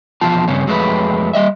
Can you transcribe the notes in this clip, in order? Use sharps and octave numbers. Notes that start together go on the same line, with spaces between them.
E2 B2 F3 F4 A5
G2 C#3 C4 C#4
F2 F#3 G#3 A3 B4
G3 D#5 E5